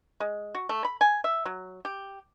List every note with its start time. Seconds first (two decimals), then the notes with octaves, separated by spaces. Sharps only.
0.20 G#3
0.55 F#4
0.69 A3
0.85 B5
1.01 G#5
1.24 E5
1.45 F#3
1.85 G4